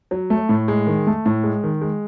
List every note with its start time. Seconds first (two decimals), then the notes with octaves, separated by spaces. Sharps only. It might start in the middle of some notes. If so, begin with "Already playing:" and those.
0.11 F#3
0.30 A3
0.49 A2
0.68 G#3
0.87 D#3
1.07 A3
1.26 A2
1.44 G#3
1.63 D#3
1.81 G#3